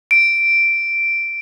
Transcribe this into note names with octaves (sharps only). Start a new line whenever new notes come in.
D7